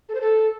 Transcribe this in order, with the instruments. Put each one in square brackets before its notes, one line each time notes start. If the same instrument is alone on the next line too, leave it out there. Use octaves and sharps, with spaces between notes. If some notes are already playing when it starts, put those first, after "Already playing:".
[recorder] A4
C5
A4